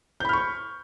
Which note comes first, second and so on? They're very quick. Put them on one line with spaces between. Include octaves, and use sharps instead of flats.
G6 B5 F6 C#6